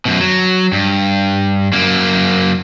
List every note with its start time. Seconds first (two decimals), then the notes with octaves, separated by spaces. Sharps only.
0.05 F#2 B2
0.21 F#3
0.73 G2
1.73 F#2 A#3